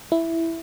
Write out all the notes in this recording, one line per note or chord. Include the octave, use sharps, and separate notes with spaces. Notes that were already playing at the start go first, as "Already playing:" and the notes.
E4